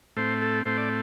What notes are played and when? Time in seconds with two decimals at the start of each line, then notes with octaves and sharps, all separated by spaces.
0.17 A2 A3 C4 C5
0.42 A4
0.65 A2 A3 C4 C5
0.78 D5